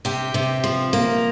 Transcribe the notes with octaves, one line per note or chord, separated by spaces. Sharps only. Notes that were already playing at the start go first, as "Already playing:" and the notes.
C3 G4
C3
F3
A#3